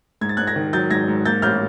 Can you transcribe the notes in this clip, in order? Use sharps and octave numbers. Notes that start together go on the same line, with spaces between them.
G#2 G#6
A6
G#2 F#6 G#6
G#6 A#6
D#3
F#3 G6 A6
G#2 G#6 A#6
G#2
A#3 G6 A6
A1 F6 G6